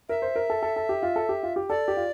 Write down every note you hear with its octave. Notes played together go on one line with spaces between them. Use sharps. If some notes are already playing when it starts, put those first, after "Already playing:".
A#4 E5
C5
A#4
A4
A4
A4
G4
F4
A4
G4
F4
G4
A4 D5
G4
F4